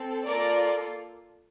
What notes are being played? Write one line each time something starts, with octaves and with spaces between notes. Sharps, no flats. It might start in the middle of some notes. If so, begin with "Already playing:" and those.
Already playing: C4 A4
A#3 F4 A4 A#4 D5